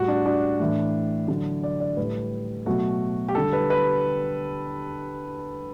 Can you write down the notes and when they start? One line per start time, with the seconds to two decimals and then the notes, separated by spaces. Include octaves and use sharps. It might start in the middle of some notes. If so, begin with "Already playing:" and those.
Already playing: A2 G3 F#4
0.08 D4
0.26 D4
0.59 A2 E3 A3
1.28 D3 F#3 A3
1.64 D5
1.80 D5
1.97 A2 G3 B4
2.66 B2 F#3 A3 F#4
3.29 G4
3.35 D3 G3 A4
3.53 B4
3.70 B4